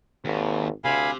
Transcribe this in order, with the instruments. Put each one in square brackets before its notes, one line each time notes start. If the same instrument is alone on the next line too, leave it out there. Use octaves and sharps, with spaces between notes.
[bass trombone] G#1 [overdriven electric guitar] D#2
[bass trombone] D2 [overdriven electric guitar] C3 [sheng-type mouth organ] F5 G#5 B5